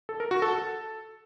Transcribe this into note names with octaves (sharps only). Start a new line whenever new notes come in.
A4
A#4
F#4
A4
A4